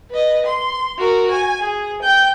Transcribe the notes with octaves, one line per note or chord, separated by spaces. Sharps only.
B4 D#5
C6
F#4 A#4
G#5
G#4
G5 G6